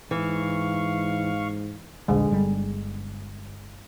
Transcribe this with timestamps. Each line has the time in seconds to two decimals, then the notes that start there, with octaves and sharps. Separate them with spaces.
0.11 G#2 E3 F5 C#6
2.08 D#1 A#1 D3 G#3
2.31 G1 G3